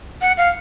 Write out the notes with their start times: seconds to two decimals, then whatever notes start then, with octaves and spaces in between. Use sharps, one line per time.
0.22 F#5
0.38 F5